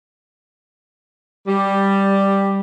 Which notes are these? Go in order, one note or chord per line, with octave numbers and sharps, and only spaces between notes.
G3